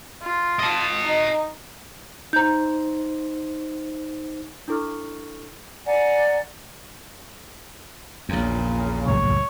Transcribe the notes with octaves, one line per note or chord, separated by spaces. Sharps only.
F4
D#5 A5
D#4
D#4 C5 A#5 G6
D4 E4 A4 C#6 F6
D5 F#5 G#5 A#5
A#1 E2 A#2 C#3
C#2 F#2 A2 C#5